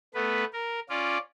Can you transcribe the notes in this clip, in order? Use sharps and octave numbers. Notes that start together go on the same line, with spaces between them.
A3 B3 B4
A#4
C#4 F4 D5